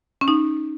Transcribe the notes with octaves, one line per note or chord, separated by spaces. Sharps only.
C#4
D#4